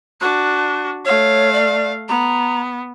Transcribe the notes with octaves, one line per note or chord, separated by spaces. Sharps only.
D4 F#4 F#6
A3 C#5 F5
D5
B3 A#5